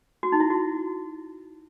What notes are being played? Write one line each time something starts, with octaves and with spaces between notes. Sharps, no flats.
F#4
D#4
E4
F#4